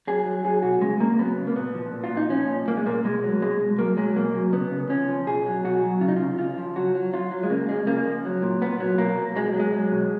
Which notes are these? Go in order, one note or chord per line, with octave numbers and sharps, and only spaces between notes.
F#3 G#4
F#3
F#3 G#4
B2 F#4
C#3 G#3
C#3 A#3
F#3 B3
C#3
A#3
A#2 B3
F3
A#2
F4
A#2
D#4
F3 C#4
A#2
A#2 A#3
G#3
A#2 A#3
B2 G#3
F#3
B2 G#3
B2
F#3 A#3
F#3 G#3
B2 A#3
F#3
C#3 B3
C#3
F3 C#4
F3
B2 G#4
F#3
B2 F#4
F#3
C#3 F4
D#4
C#3 F4
C#3 F4
F3
F#3 F#4
F#3
F#3 F4
F#3
G#3
C#3 A#3
F3 G#3
C#3 A#3
F3
F#3
A#2
A#2 B3
F#3
B2 A#3
F#3
B2 G#3
F#3
G#3
F#3
B2